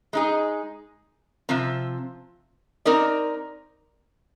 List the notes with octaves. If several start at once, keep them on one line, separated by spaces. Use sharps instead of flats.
G#3 D#4 G#4
C3 F3 C4
C4 D#4 A#4 D5